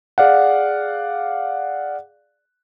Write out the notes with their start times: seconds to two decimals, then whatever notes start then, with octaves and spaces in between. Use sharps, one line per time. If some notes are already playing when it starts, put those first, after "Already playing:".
0.18 G#4 D5 F5 F#5